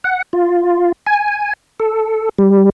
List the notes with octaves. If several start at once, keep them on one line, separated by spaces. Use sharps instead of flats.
F#5
F4
G#5
A4
G3